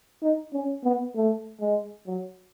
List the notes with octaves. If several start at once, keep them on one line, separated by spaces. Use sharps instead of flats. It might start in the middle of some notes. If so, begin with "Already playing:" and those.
D#4
C#4
B3
A3
G#3
F#3